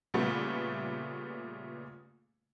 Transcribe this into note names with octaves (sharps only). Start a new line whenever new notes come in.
A#2 C#3 G3 A3 B3